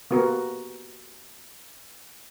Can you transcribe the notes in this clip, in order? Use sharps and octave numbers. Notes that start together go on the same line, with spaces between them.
A#3 B3 F#4 G4 A#4